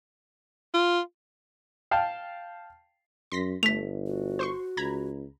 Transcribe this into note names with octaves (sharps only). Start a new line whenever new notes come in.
F4
F5 G5 A5
F#2 C6 A#6 B6
G1 A3 B6 F7
F#4
C5 C6 C#6
C#2 A#5 B5 G#6